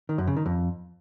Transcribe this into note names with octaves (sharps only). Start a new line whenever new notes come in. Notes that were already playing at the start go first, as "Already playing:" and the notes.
D#3
F#2
C#3
D#3
F2